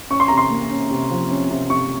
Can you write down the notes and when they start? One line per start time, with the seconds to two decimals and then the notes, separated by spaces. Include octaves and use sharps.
0.10 C#4 C#6
0.20 C6
0.28 C3 A#5
0.37 C6
0.50 A#3
0.70 C#4
0.91 C3
1.10 F3
1.31 C#4
1.50 C3
1.70 C3 C#6